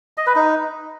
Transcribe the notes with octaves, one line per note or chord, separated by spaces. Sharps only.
D#5
B4
D#4